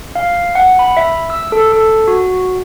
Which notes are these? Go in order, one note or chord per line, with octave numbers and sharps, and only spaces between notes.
F5
F#5
B5
E5
E6
A4
A4
F#4